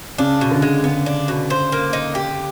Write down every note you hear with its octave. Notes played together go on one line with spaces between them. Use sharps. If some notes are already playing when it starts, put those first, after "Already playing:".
C#3 D4
B2
D3
G#3
C#3 B3
D4
B2
C5
A#3
D#4
G4